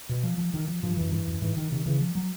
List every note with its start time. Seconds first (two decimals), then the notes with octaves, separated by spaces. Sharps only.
0.09 B2
0.23 F3
0.38 F3
0.54 D#3
0.68 F3
0.83 G2 F3
0.97 F#2 E3
1.12 G2 E3
1.28 F#2
1.42 G#2 E3
1.57 D#3
1.71 C3 D#3
1.86 C#3 E3
2.00 F3
2.15 F#3